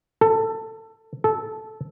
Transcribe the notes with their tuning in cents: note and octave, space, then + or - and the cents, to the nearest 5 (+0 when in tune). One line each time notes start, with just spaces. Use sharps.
A4 +20
A4 -10